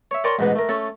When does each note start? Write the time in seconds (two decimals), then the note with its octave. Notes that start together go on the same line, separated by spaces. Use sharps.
0.11 C#5 E5
0.24 A#4 C#5 D5 G5 G#5 C6
0.39 A1 G#2 B2 B3
0.56 A3 A#4
0.69 A3 C#4 A4